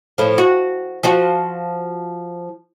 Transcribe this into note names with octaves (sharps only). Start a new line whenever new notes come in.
A2 F3
F#4
F3 F4 F#4